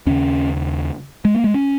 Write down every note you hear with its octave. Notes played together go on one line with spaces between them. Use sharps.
D#2 C#3 C#4
G#3
A#3
G#3
C#4